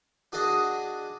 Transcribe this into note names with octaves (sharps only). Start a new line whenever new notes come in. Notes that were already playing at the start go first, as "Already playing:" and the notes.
D4 F#4 G#4 D5 D#5